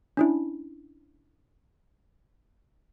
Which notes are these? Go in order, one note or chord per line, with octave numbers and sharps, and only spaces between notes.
C#4 D4 E4